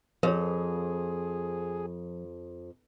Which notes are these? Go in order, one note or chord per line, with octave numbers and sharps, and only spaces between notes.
F2 F3 G#4 A#4 C#5